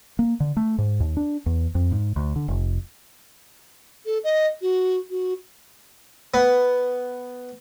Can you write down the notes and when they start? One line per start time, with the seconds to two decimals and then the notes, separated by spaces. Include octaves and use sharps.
0.19 A#3
0.40 D3
0.57 A3
0.78 G#2
1.00 D#2
1.17 D4
1.46 E2
1.75 F2
1.92 G#2
2.16 D2
2.36 D3
2.48 F1
4.06 A4
4.24 D#5
4.61 F#4
5.10 F#4
6.34 B3